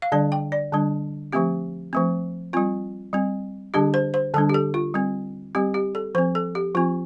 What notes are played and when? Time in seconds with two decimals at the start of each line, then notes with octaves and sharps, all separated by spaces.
0.02 F5
0.12 D3 G3 D4 D5
0.32 G5
0.52 D5
0.73 D3 G3 D4
1.32 F3 A3 C4 G4
1.93 F3 A3 C4
2.53 G3 C4 F4
3.13 G3 C4
3.74 D3 G3 D4 G4
3.94 C5
4.14 C5
4.34 D3 G3 D4 A4
4.49 G4
4.54 A4
4.74 F4
4.94 G3 C4
5.55 G3 C4 G4
5.74 G4
5.95 A4
6.15 F3 C4 C5
6.35 A4
6.55 G4
6.75 F3 C4 F4